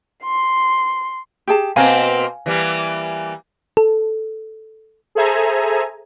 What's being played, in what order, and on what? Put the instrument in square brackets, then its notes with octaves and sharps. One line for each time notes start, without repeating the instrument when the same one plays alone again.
[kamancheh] C6
[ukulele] G4 G#4 A5
[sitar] B2 A#3 C4 [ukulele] F5 G#5 A#5
[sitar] E3 G3 A#3
[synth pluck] A4
[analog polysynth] G#4 A4 C5 E5 G#5 A#5